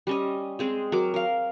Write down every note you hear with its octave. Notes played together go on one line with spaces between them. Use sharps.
G3 C#4 D#5
G#3 C4 G#4
F#3 A#4 D6
A#4 F5